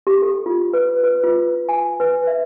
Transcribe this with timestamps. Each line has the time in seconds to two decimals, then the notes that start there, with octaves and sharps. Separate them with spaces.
0.07 G4
0.22 A4
0.46 F4
0.73 B4
1.04 B4
1.23 F4
1.69 G#5
2.00 B4
2.27 E5